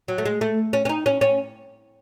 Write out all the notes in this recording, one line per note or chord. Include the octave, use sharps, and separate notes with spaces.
F#3
A3
G#3
A3
C#4
C#4
D#4
C#4
C#4